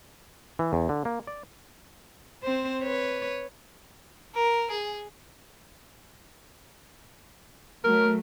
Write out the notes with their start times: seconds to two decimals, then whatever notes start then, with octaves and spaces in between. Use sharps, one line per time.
0.59 E3
0.73 E2
0.89 D3
1.05 A#3
1.27 D5
2.43 C4 C5
2.82 B4 C#5
4.35 A#4
4.70 G#4
7.84 F#3 A3 A#4